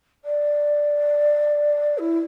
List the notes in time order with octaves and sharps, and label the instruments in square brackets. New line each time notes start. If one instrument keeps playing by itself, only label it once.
[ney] D5
E4